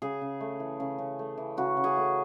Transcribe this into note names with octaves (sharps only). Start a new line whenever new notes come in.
C#3 G#4
C#3
A3
E3
C#3
C#3
A3
E3
C#3 F#4
C#3
G#4
A3